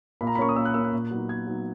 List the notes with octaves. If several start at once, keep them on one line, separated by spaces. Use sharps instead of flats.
A#2 B5
A#5
B5
A#3 C#4 C#6
D#6
A#2 E6
F#6
A#3 C#4 E6
F#6
A#2
F#3 B3 D#4
A#2 G#6
F#3 B3 D#4